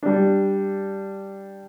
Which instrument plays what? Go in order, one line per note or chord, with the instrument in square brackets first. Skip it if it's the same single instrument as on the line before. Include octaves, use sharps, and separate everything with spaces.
[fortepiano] G3 D4